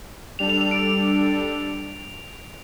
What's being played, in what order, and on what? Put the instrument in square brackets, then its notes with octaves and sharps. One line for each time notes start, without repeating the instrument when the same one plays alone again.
[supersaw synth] G3 D4 A4 [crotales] F7
[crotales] F7
F7
D7